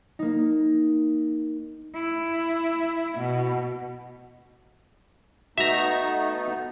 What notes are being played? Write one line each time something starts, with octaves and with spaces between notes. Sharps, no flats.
A#3 D#4
E4
B2
A3 B3 D#4 F#4 E5 A#5